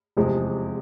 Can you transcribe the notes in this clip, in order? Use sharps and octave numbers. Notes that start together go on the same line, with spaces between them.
F1 E2 C3 F3 G#3